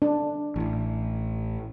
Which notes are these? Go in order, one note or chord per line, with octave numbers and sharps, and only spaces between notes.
D4
A1 A2